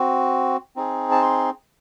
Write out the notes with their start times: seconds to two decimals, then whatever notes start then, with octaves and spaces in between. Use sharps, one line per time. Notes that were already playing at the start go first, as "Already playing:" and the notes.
Already playing: C4 F#4
0.76 C4 D#4 G#4
1.11 A5
1.22 C6